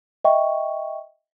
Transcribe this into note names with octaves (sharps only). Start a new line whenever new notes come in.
D#5 E5 G5 C#6